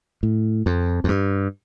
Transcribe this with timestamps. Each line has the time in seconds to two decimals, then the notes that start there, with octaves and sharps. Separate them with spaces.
0.23 A2
0.66 F2
1.04 F2
1.08 G2